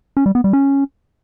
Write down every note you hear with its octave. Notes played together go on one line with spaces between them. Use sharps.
C#4
G3
B3
G3
C#4